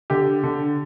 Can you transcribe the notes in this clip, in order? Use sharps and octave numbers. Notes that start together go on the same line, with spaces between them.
D3 G4
D3